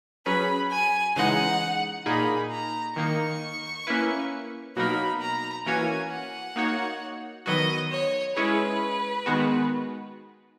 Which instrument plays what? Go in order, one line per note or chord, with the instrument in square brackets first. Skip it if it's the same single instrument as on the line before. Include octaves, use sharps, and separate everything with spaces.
[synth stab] F#3 C#4 G#4 B4 [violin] B5
[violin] G#5
[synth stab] C#3 E3 G#3 D#4 [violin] F#5
[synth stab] A#2 A#3 D#4 G#4 [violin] B5
[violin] A#5
[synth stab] D#3 A#3 D#4 [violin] C#6
[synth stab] A#3 C#4 E4 B4
[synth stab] B2 F#3 A#3 D#4 A#4 [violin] B5
[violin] A#5
[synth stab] E3 A#3 C#4 F#4 C#5 [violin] G#5
[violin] F#5
[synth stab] A#3 D#4 F#4 C#5
[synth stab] D#3 F#3 B3 F#4 [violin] D#5
[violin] C#5
[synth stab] G#3 C#4 E4 G#4 C#5 [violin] B4
[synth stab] D#3 G#3 B3 F#4